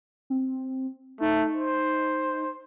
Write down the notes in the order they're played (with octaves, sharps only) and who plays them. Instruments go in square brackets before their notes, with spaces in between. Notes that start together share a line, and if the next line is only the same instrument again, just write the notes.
[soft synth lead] C4
[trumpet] A3 [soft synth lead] D#4
[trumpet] C5